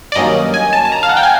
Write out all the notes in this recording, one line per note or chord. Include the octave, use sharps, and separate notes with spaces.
D5
G2 D#3 F#3 A#3 C#4 D#5
G#5
A5
A5
A#5
F5
F#5
G5
G#5